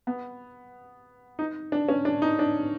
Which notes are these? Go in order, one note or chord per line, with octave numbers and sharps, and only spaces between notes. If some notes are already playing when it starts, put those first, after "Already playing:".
B3
D#4
D4
C#4
D4
D#4
D4